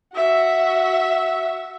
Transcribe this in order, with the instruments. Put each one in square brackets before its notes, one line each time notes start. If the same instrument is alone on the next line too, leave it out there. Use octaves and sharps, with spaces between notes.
[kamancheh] F#4 E5